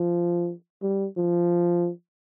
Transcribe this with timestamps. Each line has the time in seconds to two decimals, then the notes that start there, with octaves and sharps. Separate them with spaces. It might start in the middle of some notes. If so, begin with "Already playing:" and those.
Already playing: F3
0.82 G3
1.17 F3